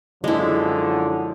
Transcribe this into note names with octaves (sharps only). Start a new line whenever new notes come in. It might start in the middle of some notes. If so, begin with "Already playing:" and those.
F#2 D3 F3 G#3 E4